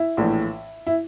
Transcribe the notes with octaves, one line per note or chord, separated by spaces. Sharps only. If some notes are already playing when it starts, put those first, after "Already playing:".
Already playing: E4
A#1 A2 E3
E4